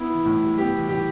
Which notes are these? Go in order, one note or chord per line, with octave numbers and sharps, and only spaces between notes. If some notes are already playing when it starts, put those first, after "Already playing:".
Already playing: B3 E4
E3
A2
G3
B3 G4
E3
A2 G4